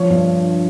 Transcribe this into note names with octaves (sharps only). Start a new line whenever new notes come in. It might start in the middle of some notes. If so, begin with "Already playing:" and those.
Already playing: F3 C#5
G2